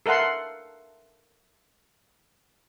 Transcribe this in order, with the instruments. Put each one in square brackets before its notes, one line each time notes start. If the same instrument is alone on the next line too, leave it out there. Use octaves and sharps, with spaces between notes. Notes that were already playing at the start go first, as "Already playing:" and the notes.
[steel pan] A4 A#4 E5 F#5 C6